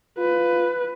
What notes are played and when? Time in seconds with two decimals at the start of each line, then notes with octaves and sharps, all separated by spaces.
0.18 F4 B4